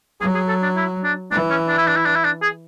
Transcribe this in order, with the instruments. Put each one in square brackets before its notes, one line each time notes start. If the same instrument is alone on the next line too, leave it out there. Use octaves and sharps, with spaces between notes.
[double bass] F#3 [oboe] G#4
[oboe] G#4
A4
D4
E4
D4
[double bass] E3 [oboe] D4
[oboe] C#4
D4
E4
D4
E4
D4
E4
D4
G#4